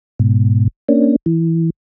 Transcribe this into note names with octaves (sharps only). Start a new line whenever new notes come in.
G#2 B2
A#3 C#4 D4
E3